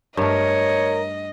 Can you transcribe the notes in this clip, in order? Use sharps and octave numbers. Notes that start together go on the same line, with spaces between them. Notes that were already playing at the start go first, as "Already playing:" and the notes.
G2 A3 A#4 C#5 D#5